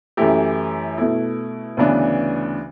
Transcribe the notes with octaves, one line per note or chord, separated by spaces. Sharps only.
F#2 E3 A3 E4 G4
B2 A3 E4
D2 C#3 E3 B3 D4